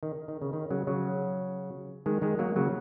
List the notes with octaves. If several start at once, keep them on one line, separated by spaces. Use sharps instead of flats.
D#3
D#3
C#3
D#3
C#3 F#3
C#3 F#3
D#3 G#3
D#3 G#3
F#3 A#3
C#3 F#3